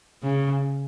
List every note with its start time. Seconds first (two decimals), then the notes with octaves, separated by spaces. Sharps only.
0.23 C#3